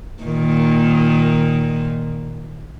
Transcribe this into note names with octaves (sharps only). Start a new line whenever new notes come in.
A#2 D#3 A#3